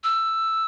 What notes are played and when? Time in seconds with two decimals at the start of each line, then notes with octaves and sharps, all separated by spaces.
0.04 E6